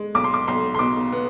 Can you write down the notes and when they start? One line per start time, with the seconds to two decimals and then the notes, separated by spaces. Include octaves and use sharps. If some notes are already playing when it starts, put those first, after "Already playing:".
Already playing: G#3
0.15 B1 D6
0.24 C6
0.34 D6
0.48 B1 C6
0.75 C6
0.79 B2 D6
1.12 B3